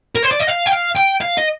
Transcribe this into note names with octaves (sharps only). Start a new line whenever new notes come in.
A#4
C5
D5
D#5
F5
G5
F5
G5
F5
D#5